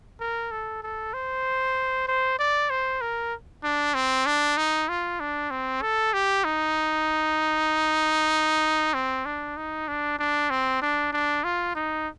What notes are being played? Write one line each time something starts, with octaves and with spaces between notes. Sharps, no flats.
A#4
A4
A4
C5
C5
D5
C5
A#4
D4
C4
D4
D#4
F4
D4
C4
A4
G4
D#4
C4
D4
D#4
D4
D4
C4
D4
D4
F4
D#4